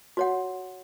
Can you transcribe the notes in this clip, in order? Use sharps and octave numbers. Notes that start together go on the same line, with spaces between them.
F#4 C#5 F#5